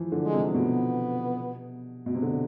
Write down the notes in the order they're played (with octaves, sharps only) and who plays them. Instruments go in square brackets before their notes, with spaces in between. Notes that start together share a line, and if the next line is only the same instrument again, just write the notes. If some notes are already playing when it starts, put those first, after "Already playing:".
Already playing: [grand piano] E3 F3
D3
[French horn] G#3
[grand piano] C3
[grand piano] B2 [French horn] B3
[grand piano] B2
C3
D3